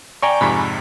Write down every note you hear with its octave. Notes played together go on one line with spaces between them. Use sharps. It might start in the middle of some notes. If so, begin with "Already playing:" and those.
D5 G5 G#5 A#5 C#6
F2 G#2 C3 B5